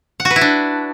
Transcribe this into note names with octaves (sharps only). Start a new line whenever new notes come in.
F#5
F#4
B4
E4
D4